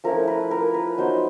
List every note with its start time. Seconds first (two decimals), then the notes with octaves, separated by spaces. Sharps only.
0.04 F3 A3 C#4 E4 A#4
0.28 B4
0.51 A#4
0.74 B4
0.98 F#3 B3 D#4 C5